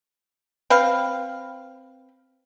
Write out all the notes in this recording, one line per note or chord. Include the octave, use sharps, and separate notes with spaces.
C4 B4 F5